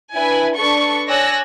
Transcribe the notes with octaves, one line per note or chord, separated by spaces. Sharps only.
D4 E4 B4 G#5
D4 A4 B4 C#6
C#5 D5 G#5 E6 F#6 A#6